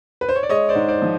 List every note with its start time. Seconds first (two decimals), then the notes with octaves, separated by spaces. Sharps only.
0.21 B4
0.29 C5
0.36 C#5
0.43 D5
0.49 G#3 C#5 D#5
0.69 C5 D5
0.75 G#2
0.88 C5 D5
1.02 F3